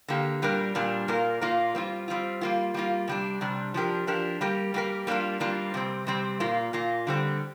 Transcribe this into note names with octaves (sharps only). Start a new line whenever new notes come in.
D3 A#3 G4
A#2 G3 D4 A#4
A#2 G3 D4 A#4
A#2 A#3 F4 A#4
A#2 A#3 F4 A#4
G3 C4 F4
G3 C4 F4
G3 A#3 F4
G3 A#3 F4
C3 G3 D4
C3 G3 D4
F3 D4 G4 A#4
F3 D4 G4 A#4
G3 A#3 G4 A#4
G3 A#3 G4 A#4
G3 A#3 D4 F4 A#4
G3 A#3 D4 F4 A#4
C3 G3 C4
C3 G3 C4
A#2 A#3 F4
A#2 A#3 F4
D3 G3 C4